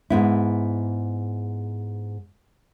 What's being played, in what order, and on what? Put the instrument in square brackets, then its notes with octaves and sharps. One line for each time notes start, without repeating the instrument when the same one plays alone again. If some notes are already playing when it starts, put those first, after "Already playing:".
[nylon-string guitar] G#2 B3 E4